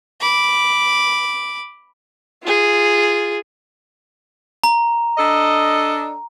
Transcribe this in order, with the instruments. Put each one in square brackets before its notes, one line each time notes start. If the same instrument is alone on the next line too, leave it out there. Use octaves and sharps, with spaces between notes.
[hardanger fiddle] B5 D6
F4 G#4
[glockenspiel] A#5
[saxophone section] D4 A4 D#5